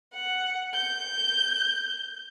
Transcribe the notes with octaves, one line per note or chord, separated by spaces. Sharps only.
F#5
G6